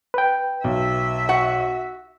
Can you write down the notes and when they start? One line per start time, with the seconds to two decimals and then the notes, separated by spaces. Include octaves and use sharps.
0.14 B4 G5
0.64 B1 E5
1.29 F#4 F#5